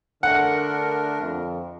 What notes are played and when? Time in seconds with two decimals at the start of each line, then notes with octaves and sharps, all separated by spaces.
0.23 D3 A3 D4 A#4 F#5
1.22 F2